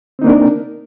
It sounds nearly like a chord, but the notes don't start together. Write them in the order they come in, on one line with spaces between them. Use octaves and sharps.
C4 D#4 A#3 D4 A#4